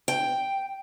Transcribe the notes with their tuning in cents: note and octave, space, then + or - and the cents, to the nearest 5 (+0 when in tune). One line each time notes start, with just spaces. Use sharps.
G5 +0